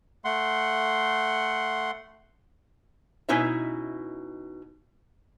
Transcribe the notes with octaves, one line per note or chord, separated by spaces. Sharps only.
A3 F#5 C6
B2 C#4 D#4 E4 B4 E5